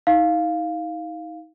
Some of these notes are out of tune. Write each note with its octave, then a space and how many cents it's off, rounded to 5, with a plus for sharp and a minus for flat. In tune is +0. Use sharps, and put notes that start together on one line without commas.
D#4 +35 F5 +0